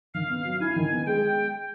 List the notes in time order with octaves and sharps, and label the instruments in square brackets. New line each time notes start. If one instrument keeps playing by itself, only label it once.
[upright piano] D#3 [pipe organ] F5
[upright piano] B3
F#3
[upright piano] E4 [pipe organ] G#5
[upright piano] D#3
B3
[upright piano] G#3 [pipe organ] G5